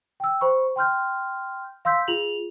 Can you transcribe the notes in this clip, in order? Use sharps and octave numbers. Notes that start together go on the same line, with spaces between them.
G5 E6
C5 B5 C#6
G5 C6 F6 G6
F5 C6 E6 G6 B6
F4 G#4 F7 F#7